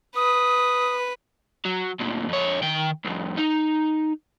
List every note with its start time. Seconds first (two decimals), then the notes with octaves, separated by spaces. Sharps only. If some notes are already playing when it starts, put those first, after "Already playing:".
0.16 B4 D#6
1.65 F#3
2.00 D2 A#2
2.29 F2 C#5
2.62 D#3 G5
3.04 C2 F2
3.37 D#4